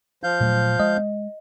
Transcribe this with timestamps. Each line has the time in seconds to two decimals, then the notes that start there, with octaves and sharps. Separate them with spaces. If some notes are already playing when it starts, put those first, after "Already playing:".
0.23 F3 F5 G6
0.40 A#2 F#3 A3
0.79 G#3 D#5